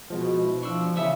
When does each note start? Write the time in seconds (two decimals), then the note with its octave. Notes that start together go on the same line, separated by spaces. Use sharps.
0.10 B2 F3 G#3 B3
0.44 E4
0.63 F3 D4 C#6 E6
0.96 E2 C#3 B3 E4 G#4 E5